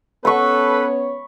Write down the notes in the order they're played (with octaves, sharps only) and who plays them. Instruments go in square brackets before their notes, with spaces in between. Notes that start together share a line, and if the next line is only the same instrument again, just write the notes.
[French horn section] B3 C#4 C#5 [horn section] A4 B4 [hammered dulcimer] B5 C#6